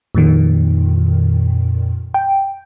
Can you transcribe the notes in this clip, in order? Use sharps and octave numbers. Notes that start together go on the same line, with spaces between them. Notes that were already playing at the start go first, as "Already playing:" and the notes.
F2 A#2 D#3
G5